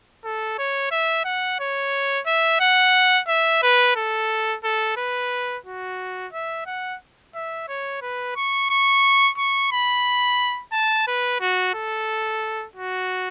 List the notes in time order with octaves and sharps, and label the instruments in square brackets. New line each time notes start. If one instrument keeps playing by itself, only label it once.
[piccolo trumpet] A4
C#5
E5
F#5
C#5
E5
F#5
E5
B4
A4
A4
B4
F#4
E5
F#5
E5
C#5
B4
C#6
C#6
C#6
B5
A5
B4
F#4
A4
F#4